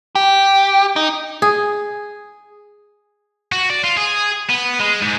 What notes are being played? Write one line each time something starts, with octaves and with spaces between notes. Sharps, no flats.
G4
D#4
G#4
F#4
D5
F4
G#4
B3
G#3
G#2